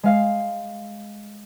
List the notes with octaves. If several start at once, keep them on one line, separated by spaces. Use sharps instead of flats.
G#3 F5 C7